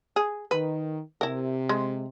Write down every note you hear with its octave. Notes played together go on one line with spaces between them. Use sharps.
G#4
D#3 B4
C3 E4 A#4
G#3